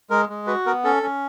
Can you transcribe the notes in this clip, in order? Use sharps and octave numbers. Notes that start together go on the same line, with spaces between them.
G#3 A#4
G#3
F#4 B4
B3 A#4
C#4 A4
C#4